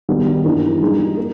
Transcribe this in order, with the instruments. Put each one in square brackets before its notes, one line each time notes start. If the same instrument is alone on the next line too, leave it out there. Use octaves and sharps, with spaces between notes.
[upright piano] D#3 G3 B3 D#4
G2 E3 A#3 D#4
G3 A#3 D#4 G#4
A#3